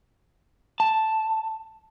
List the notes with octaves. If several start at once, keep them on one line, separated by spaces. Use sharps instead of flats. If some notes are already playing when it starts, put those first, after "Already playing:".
A5